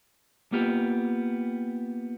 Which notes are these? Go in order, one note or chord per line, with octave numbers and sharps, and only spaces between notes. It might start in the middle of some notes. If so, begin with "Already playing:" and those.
A#3 B3 F4 G4